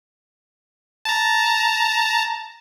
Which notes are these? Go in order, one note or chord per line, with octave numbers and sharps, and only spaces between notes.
A5 A#5